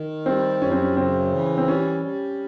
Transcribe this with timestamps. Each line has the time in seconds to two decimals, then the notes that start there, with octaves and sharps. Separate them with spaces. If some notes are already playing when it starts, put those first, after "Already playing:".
Already playing: D#3
0.26 G3 C4
0.62 F#2 C#4
0.72 C4
0.82 C#4
0.97 C#3 C4
1.32 E3
1.58 C4
1.68 G3 C#4
2.03 G3